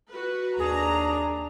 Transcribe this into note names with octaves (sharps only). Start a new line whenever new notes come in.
F#4 B4
D#2 D4 G#4 A#5